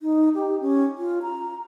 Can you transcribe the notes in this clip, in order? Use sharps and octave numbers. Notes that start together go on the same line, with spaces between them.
D#4
G4
C#4
F4
A#5